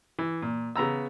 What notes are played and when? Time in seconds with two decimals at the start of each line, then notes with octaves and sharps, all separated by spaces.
0.19 E3
0.42 A#2
0.76 C#3 B3 A#5 E6